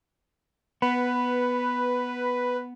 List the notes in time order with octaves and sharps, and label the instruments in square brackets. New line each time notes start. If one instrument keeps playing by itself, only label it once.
[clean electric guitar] B3 [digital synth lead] B4